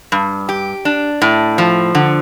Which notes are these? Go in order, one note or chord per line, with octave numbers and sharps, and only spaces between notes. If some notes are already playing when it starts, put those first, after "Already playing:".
G2
G4
D4
A2
F3
D3